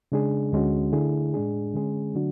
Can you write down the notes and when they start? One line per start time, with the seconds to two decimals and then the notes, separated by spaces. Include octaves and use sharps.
0.12 C#3 G#3 D4 G#4
0.52 D2 D3 G#3 C#4 F#4
0.93 D3 A3 E4 G#4
1.34 A2 G#3 D4 G#4
1.74 D3 G#3 C#4 G#4
2.15 D3 F#3 A3 D4 F#4